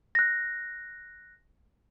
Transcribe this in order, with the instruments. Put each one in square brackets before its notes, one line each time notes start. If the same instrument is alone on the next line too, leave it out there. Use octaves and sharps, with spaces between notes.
[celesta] F#6 A#6